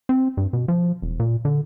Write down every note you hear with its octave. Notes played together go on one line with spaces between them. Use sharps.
C4
G2
B2
F3
E1
A#2
D3